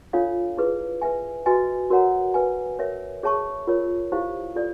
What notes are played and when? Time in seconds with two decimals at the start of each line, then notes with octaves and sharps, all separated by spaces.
0.13 D4 F4 A4 C#5 F5
0.57 E4 G#4 B4
1.02 B4 E5 G#5
1.46 F#4 B4 D#5 G#5
1.90 F#4 A#4 C#5 F#5 A#5
2.34 B4 E5 G#5
2.79 A#4 C#5 E5
3.23 G#4 C#5 E5 A5 C#6
3.67 F4 A#4 C#5
4.12 E4 G4 C5 F5
4.56 F4 A4 D5